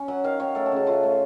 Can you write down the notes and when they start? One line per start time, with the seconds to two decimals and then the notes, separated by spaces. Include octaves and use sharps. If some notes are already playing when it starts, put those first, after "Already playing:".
Already playing: C#4
0.08 F#3 F#5
0.24 D#3 F5
0.40 D#3 C#5
0.55 A3 A#4
0.66 A4
0.72 C#3 F#4
0.87 A3 F4
1.03 A3